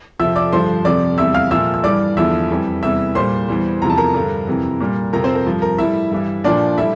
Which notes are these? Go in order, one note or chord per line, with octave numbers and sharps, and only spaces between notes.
F2 C3 F3 E5 E6
D5 D6
G2 D3 F3 C5 C6
F2 C3 F3 D5 D6
E2 C3 G3 E5 E6
F5 F6
A#2 F3 E5 E6
E6
G2 E3 G3 D5 D6
E2 D3 F3 E5 E6
F2 E3 G3
E2 C3 E3 G3 E5 E6
A#2 G3 C5 C6
E2 E3 G3
E2 C3 F3 A#5
A5
A#4 A#5
G2 D3 G3
F2 C3 E3
A#2 G3
F2 C3 F3 A#4 A#5
C4 C5
A#4
G2 F3
A#4
A2 G3 E4 E5
G2 E3 G3
A#2 F3 D4 D5
A2 G3 E4 E5